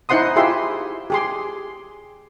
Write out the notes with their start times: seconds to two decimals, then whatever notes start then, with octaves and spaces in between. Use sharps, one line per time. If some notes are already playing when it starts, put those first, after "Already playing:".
0.09 D#4 E4 C5 F#5 C6 D#6
0.36 E4 F4 G4 G#4 E5 C6
1.10 G4 G#4 C6